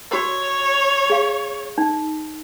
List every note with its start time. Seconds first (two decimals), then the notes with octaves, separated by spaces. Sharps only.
0.11 F#4 A#4 C#5
1.10 G#4 F5
1.78 D#4